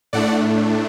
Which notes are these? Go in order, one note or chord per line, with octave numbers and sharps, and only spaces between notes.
A2 A3 D4 D5 F#5